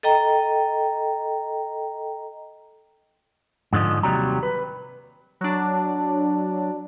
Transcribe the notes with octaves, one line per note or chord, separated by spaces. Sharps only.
A4 D#5 G5 A#5
G#2 D3 F3 D#5
D#2 C3 F#3 G3 A#5
B4
F#3 D4